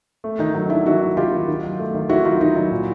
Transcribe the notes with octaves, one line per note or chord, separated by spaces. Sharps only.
A3
D#3 D#4
F#3 D#4
F#3 D4 E4
D#3 E4 F#4
D#3
D#3 F4 G4
D#3
D#3
F#3
A3
D#3
D#3 E4 F#4
F#3 D#4 F4
D#3 D#4
F#3 D#4
A#2